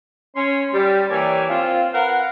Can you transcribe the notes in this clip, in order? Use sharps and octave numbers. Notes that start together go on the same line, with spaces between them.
C#4 C6
G3
E3 A#3 G4 C#5 D5 G#5
C4 F4 F5
A#4 B4 F5 F#5